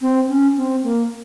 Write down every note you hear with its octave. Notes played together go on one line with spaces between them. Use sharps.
C4
C#4
C4
A#3